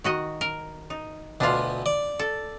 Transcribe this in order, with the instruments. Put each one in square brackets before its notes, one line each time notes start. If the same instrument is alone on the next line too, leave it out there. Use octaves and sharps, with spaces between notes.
[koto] D#3 F#4 D#5
A#4
D#4
[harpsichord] D2 B2 [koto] D4 F4
[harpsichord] D5
[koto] A4